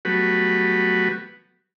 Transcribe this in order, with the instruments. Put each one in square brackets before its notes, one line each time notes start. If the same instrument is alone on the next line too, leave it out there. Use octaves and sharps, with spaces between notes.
[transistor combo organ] F#3 G3 A3 B3 F#4 B4